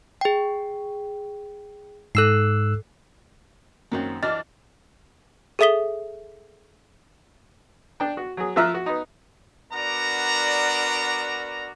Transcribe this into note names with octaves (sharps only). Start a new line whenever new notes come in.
G#4 G5
G#2 A4 E6 F#6 C7
F#2 D#3 F#3 A#3 C4
E3 F#3 D4 D#5 F6 A6
G#4 A4 E5 D#6 B6 G7
D4 G5
F#4
F#3 G#4
F3 F4 E5 A#5 F6 F#6
F#4
B3 D#4
B3 D4 F#4 A#4 D5 A#5